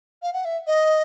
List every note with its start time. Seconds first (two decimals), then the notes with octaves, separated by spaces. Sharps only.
0.23 F5
0.33 F#5
0.45 E5
0.67 D#5